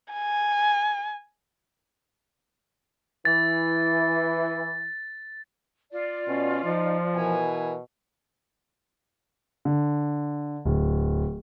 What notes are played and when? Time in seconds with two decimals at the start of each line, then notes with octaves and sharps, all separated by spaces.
0.13 G#5
3.25 E3 A6
5.92 F4 D5
6.28 B2 C#4
6.64 F3 D#4
7.15 B2 E3 A#4 G#5
9.65 D3
10.65 D1